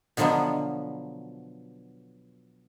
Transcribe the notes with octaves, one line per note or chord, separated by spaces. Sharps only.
B2 D3 F3 F#3 B3 F#4